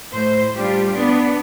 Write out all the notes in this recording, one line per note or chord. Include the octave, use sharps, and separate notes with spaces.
A2 C5
G3 D4 F4 G4
B3 D4